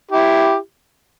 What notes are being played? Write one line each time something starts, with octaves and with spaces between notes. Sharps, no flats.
E4 G4